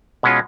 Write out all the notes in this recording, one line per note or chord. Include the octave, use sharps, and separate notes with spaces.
B2 G#3 C#4 F4